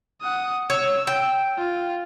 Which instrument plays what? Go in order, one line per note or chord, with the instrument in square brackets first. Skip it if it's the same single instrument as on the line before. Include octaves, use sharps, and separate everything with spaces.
[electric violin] F#5 D#6
[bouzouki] C#5 [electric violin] E6
[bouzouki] G5
[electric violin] F4